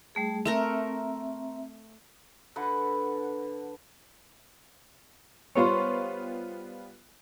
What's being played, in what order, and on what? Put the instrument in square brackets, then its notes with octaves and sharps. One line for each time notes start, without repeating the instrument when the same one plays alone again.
[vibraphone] G3 A3 G#4
[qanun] A3 A#4 A#5 [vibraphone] C4 E5
[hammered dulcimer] D3 B4 F#5
[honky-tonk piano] G3 B3 F4 [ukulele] C5 C#5